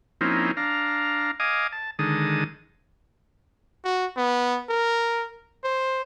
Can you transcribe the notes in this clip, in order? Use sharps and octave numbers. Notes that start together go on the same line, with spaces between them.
F3 A#3 C4 C#4 D#4 E4
D4 F5 A#5
D#5 F5 G#5 D6 D#6
A5
D3 D#3 G#3 A5 D#6
F#4
B3
A#4
C5